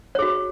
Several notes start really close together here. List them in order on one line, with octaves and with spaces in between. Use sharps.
C#5 G#4 F#4